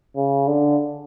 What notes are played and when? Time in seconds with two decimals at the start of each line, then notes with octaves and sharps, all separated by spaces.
0.16 C#3
0.48 D3